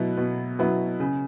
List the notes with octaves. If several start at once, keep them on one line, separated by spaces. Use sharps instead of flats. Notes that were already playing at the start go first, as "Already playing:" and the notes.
Already playing: B2 F#3 B3 E4
B2
F#3 B3 E4
C#3